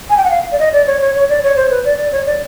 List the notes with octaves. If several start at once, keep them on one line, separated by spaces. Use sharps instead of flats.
G#5
G5
F#5
F5
D5
D#5
D5
C#5
C#5
C#5
D5
C#5
C5
B4
D5
D5
C#5
D5